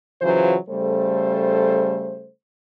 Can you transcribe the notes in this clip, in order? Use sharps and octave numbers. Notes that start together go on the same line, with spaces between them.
C#3 E3 F#3 F4 F#4 C5
C#3 G3 A3 A4 C5